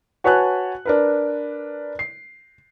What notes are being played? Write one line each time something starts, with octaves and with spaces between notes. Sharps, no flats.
F#4 B4 C#5 G#5 A5 F#6
D4 A#4 B4
C7